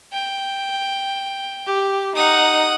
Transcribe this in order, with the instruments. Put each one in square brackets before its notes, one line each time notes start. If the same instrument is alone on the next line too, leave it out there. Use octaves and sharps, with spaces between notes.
[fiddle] G5
[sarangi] G4
[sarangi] D#4 [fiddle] F#5 D#6